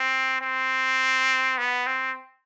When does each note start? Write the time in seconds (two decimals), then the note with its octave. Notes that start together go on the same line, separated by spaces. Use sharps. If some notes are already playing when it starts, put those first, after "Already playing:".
Already playing: C4
0.41 C4
1.58 B3
1.87 C4